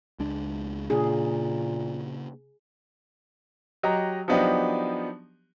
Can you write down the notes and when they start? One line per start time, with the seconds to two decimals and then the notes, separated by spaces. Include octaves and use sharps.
0.19 C#2 G#3 D4
0.90 A#2 C#3 A#3 D4 G#4
3.83 F#3 G4 D#5 A#5
4.28 F3 F#3 B3 D4 D#4 G4